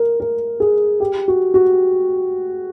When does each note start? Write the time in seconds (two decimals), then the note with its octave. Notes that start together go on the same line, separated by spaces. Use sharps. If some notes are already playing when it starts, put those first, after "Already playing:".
Already playing: A#4
0.20 A#4
0.60 G#4
1.00 G4
1.28 F#4
1.54 F#4